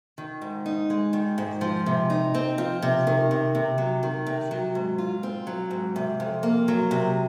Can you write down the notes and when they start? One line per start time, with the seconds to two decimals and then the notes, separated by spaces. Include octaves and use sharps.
0.18 D#3
0.42 G#2
0.66 D#4
0.90 G#3
1.13 D#3
1.38 G#2
1.61 F3
1.86 C3
2.10 D#4
2.35 C4
2.58 F3
2.82 C3
3.07 D#3
3.31 C3
3.55 C3
3.78 F#3
4.03 D#3
4.27 C3
4.51 F#3
4.75 G#2
4.98 F4
5.23 C4
5.47 F#3
5.71 G#2
5.96 C3
6.20 F2
6.43 A#3
6.68 F#3
6.91 C3